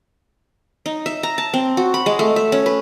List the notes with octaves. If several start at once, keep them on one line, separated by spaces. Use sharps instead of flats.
D#4
E5
A#5
A5
C4
F#4
B5
G#3
A3
E5
C#4
B4